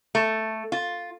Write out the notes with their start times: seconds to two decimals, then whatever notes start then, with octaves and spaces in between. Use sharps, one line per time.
0.15 A3
0.72 F4